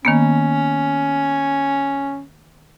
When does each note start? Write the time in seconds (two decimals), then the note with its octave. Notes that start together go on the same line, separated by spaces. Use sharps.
0.05 D#3 A#3 B3 C#4